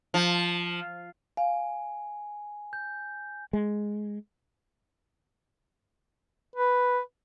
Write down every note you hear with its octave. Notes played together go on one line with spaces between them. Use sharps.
F3
F5 G#5
G6
G#3
B4